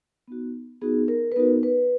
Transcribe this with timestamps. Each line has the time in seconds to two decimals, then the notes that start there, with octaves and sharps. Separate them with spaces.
0.28 B3 D#4 F#4
0.81 B3 D#4 F#4 G#4
1.08 A#4
1.32 B4
1.36 B3 D#4 F#4 A#4
1.63 B4